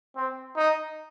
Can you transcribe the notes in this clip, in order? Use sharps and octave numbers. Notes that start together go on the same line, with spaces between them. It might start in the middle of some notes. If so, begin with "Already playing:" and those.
C4
D#4